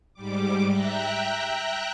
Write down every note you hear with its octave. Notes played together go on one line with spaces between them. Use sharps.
G#2 G3 D6
E5 G5 A#5 F#6